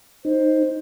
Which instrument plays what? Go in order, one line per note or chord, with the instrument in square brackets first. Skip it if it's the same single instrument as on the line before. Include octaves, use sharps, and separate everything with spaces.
[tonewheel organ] D#4 [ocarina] C5